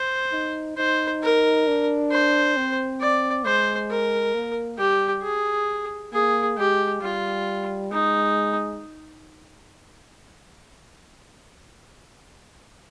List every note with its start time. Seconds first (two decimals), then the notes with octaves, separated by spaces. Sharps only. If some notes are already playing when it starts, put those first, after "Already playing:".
Already playing: C5
0.32 D#4
0.77 D#4 C5
1.23 A#4
1.67 D4
2.12 C5
2.56 C4
3.01 D5
3.45 G#3 C5
3.90 A#4
4.34 A#3
4.78 G3 G4
5.23 G#4
6.13 A#3 G#4
6.57 G#3 G4
7.02 G3 F4
7.91 G#3 D#4